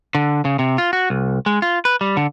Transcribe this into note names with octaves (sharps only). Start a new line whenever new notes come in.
D3
C#3
C3
F4
F#4
C2
G#3
F4
B4
G3
D3